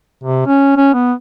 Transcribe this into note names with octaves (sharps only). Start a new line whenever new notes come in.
C3
C#4
C#4
B3